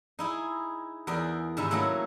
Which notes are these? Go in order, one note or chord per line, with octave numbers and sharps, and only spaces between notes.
D#4 E4 G#4
E2 G#4 A#4 D5 G5
G#2 C3 D#3 E4 E5
F#3 A3 A#3 C#4 D#4 E4